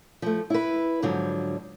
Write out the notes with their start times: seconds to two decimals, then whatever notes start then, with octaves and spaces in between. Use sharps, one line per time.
0.22 F3 A3
0.50 E4 B4
1.02 G#2 D3 F3 F#3